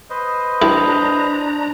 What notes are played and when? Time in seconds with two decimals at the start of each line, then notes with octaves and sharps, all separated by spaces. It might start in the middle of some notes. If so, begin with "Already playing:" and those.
0.10 B4 C5 D#5
0.62 D4 E4 G4 A4 A#5